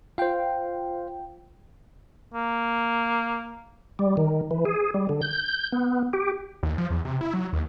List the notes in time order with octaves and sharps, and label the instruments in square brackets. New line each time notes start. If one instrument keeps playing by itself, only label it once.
[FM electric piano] F4 G5 [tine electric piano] C5 F5
[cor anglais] A#3
[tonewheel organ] G3
D#3
E3
G#4
G3
D3
G6
B3
G4
[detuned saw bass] D#2
F3
E2
C3
E4
F#3
D#2